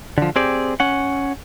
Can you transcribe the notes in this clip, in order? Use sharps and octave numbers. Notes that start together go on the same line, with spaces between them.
D3 F3
C4 G4 G#4 D5
C#4 F#5